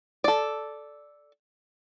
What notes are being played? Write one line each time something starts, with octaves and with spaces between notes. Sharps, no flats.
A4 D5